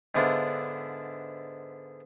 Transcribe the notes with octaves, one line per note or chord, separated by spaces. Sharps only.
G#2 D3 B3 D4 E4 F4